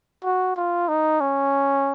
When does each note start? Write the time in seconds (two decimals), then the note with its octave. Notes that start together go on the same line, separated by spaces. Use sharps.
0.24 F#4
0.57 F4
0.88 D#4
1.20 C#4